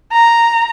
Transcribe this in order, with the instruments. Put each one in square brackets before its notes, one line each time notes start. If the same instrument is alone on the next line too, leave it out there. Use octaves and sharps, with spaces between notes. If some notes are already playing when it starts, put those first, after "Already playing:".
[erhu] A#5